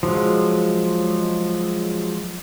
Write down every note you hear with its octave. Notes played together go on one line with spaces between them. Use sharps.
F3 F#3 G#3